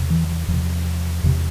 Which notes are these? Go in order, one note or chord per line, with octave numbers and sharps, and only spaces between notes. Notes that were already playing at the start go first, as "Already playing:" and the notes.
Already playing: E2 C3
E3
E3
E2 C3 F3
E2 C3